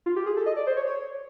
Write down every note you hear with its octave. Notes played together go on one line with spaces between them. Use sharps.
F4
G4
G#4
A4
D#5
D5
C5
C#5
C#5